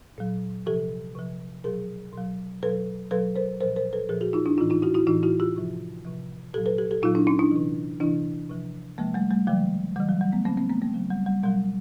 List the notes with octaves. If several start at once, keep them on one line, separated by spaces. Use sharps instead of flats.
A#2 F#3
C3 F3 G4 A4
C3 F3
B2 F#3 G#4 A#4
B2 F#3
B2 F#3 A4 B4
B2 F#3 A4 B4
A#4 C5
A#2 F3 A#4 C5
A#4 C5
A4 B4
A#2 F3 G#4 A#4
F#4 G#4
D#4 F4
D4 E4
A2 E3 D#4 F4
D#4 F4
E4 F#4
E4 F#4
A2 E3 D#4 F4
E4 F#4
F4 G4
C3 F3
C3 F3
A#2 F#3 G4 A4
A4 B4
G4 A4
G4 A4
A#2 F#3 D#4 F4
D4 E4
C#4 D#4
D4 E4
C3 E3
C3 E3 D4 E4
C3 F3
C3 F3 G#3 A#3
G3 A3
G3 A3
C#3 E3 F#3 G#3
C#3 E3 G3
F#3
G3
A3 B3
C#3 F#3 A#3 C4
A#3 C4
A3 B3
G#3 A#3
C#3 F#3
G3
G3
B2 F#3 G3